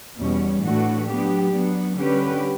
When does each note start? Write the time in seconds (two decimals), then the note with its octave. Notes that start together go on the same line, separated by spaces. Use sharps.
0.18 E2 B2 G3 C#4
0.62 A2 E3 A3 D4 F#4
1.07 F#3 B3 D4 G4
1.52 F#3 B3 D4
1.97 D3 G3 C#4 G4 B4